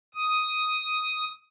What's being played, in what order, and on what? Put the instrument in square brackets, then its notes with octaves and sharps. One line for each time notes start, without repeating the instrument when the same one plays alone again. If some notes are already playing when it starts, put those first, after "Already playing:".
[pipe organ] D#6